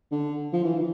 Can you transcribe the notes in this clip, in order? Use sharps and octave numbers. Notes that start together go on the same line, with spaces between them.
D3
F3
E3
D#3